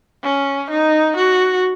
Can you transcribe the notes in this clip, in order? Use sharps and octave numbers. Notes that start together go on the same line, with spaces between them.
C#4
D#4
F#4